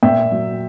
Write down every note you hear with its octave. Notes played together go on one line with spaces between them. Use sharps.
A#2 E5 G5
F#3